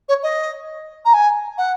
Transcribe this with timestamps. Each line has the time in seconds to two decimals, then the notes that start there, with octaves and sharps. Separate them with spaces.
0.09 C#5
0.23 D#5
1.05 A#5
1.14 G#5
1.58 F#5